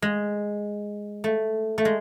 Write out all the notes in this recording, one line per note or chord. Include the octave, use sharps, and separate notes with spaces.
G#3
A3
A3
G#3